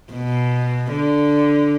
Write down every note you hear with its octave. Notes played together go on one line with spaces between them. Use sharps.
B2
D3